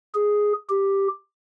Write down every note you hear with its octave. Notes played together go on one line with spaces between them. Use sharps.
G#4
G4